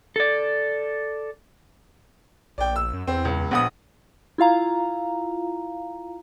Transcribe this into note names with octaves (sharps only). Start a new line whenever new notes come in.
A4 D5
A#1 D5 G5
A#1 E6
F#2
E2 C4
C#2
A#1 B3 F#5 D#6
E4 F4 F5 A#5